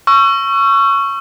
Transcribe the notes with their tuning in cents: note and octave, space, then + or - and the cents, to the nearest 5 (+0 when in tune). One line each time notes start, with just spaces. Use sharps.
C#6 +0 E6 +45